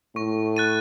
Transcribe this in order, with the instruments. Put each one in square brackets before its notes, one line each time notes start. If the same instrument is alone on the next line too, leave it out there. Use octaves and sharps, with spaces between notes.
[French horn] A2 [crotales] C#6
[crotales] F#6 A6 D#7